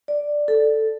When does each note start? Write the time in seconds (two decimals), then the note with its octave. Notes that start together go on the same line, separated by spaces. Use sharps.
0.08 D5
0.48 A4